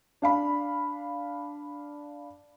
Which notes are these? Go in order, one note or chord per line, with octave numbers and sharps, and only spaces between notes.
D4 F5 B5